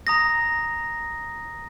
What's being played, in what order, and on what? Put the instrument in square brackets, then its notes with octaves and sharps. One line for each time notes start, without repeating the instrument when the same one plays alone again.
[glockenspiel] A#5 D#6 A#6